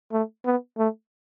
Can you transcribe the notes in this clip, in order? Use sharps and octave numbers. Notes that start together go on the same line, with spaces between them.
A3
B3
A3